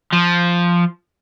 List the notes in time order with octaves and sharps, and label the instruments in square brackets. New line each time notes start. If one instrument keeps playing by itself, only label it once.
[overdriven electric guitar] F3